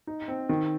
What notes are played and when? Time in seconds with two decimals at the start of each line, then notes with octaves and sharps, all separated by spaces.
0.07 D#4
0.28 C4
0.49 D#3